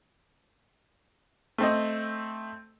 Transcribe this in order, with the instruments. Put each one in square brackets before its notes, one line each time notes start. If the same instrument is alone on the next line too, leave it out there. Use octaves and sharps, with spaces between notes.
[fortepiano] A3 C4 D#5